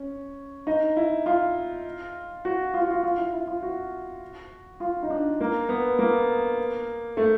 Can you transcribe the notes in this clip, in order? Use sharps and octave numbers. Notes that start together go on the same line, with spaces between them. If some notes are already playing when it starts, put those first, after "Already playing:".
Already playing: C#4
D#4
E4
F4
F#4
F4
F#4
F4
F4
E4
E4
F4
F#4
F4
D#4
D4
A#3
B3
A#3
A3